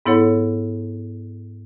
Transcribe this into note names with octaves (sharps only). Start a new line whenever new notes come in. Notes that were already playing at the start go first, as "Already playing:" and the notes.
G#2 B3 E4 A4 C#5 F#5